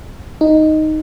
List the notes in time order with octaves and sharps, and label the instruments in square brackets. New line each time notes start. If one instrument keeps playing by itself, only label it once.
[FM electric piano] D#4